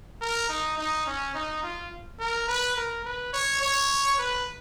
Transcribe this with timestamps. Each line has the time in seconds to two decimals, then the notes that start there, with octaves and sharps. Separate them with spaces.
0.21 A#4
0.49 D#4
0.78 D#4
1.06 C#4
1.35 D#4
1.63 F4
2.20 A#4
2.48 B4
2.76 A#4
3.05 B4
3.33 C#5
3.62 C#5
4.18 B4